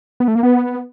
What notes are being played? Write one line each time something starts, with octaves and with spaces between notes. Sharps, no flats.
B3
A3
A#3
B3